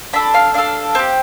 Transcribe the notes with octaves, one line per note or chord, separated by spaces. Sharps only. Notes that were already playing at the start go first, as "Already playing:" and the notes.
D4 A4 B5
F5
D4 A4 F5
C4 G4